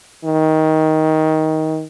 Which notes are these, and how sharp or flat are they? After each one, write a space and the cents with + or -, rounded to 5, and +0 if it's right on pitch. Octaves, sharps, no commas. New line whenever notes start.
D#3 +15